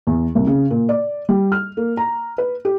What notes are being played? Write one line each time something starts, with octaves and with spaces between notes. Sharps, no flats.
E2
C2
C#3
A#2
D5
G3
F6
A#3
A#5
B4
G4